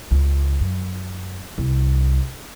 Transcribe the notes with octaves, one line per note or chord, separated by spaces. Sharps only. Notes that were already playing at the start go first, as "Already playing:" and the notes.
C#2
F#2
C2